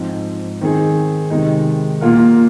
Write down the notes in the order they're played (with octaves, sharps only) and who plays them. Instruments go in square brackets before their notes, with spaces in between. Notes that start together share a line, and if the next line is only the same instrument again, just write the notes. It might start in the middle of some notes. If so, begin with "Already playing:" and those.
Already playing: [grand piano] G#2 F3 C4
D#3 C4 D#4 G#4
C3 D#3 G#3 D#4
A#2 A#3 F4 A#4